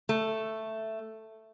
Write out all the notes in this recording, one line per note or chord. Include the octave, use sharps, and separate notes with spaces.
A3